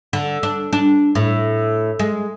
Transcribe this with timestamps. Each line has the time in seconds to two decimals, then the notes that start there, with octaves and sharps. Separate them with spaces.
0.13 D3
0.43 D4
0.73 D4
1.15 A2
1.99 G#3